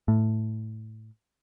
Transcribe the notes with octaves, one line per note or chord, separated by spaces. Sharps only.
A2